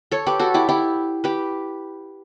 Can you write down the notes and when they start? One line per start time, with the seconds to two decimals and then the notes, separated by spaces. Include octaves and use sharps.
0.11 A4 C#5
0.26 G4 B4
0.39 F#4 A4
0.54 E4 G4
0.69 E4 G4
1.24 G4 B4